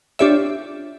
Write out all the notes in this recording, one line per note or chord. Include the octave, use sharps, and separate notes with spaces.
D4 F4 G4 C#5 D5 E5